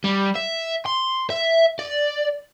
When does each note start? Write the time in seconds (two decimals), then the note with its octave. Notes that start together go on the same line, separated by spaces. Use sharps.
0.04 G3
0.36 E5
0.86 C6
1.30 E5
1.79 D5